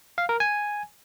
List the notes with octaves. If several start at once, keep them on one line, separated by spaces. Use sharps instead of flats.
F5
A#4
G#5